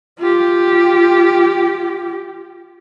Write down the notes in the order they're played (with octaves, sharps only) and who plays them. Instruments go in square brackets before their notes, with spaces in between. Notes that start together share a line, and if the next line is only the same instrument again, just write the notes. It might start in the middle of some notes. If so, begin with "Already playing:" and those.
[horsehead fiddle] F4 G4